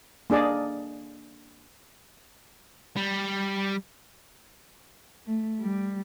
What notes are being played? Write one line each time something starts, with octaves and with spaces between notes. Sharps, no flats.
A#3 D4 G#4 D5 D#5
G3
A3
G3